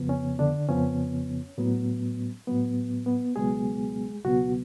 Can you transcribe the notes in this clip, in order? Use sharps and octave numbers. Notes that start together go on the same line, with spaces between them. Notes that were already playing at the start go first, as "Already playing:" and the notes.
Already playing: F2 C#3 F3 B3
C#4
D3 D4
F2 C#3 F3 B3 C#4
A2 F#3 B3
A2 F#3 B3
B3
C#2 B2 F#3 G#3 B3 G#4
C#2 B2 F#3 B3 F#4